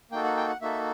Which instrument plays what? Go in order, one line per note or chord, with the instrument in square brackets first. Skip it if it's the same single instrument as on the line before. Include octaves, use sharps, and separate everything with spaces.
[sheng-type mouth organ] A#3 D#4 F#4 A4 G5
F#5
G5
F#5
A#3 D#4 F#4 A4 E5